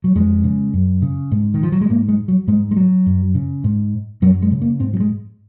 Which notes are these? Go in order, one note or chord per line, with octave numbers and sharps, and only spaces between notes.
F#3
F2 G#3
C#3
F#2
C#3
G#2
D#3
F3
F#3
G#3
G#2 A#3
G#3
F#3
G#2 G#3
G#3
F#3
F#2
C#3
G#2
F#2 F#3
G#3
C#3
A#3
G#2 C4
F#3
G#3